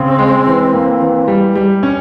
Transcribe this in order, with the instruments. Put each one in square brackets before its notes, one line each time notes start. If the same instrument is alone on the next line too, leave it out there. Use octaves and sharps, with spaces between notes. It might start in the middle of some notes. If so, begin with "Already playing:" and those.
Already playing: [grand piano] C#3 [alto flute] C4
[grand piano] G#3
E3
A#3
E3
G3
G3
C#4